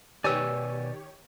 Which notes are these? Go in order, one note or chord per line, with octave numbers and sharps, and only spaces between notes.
B2 D#3 G4 B4 C#5 D5 G#5 E6